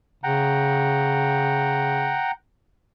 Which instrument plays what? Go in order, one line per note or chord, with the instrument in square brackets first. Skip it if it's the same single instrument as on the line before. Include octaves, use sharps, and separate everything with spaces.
[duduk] C#3 [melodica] F#5 G5 A#5